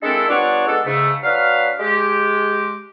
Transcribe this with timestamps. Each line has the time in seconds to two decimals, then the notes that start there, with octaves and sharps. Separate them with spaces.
0.03 G#3 A#3 C4 D4 E4 A4
0.29 G3 B3 D4 F4 C#5 D5
0.68 G#3 B3 D4 A4
0.86 G#2 C#3 A3
1.24 F#3 D4 B4 F5
1.80 G#3 G4